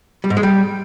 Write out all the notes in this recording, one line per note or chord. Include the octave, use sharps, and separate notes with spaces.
G3
G#2
G#3
G3